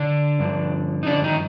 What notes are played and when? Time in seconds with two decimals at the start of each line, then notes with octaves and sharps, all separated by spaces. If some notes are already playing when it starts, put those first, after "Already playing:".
Already playing: D3 D4
0.39 G2 D3 F3
1.03 D#4
1.06 D3 D4
1.23 D#3 D#4